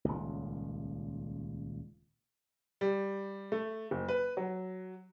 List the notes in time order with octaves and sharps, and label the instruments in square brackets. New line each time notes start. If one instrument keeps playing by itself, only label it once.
[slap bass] D#1 C#2
[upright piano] G3
A3
F#1
B4
F#3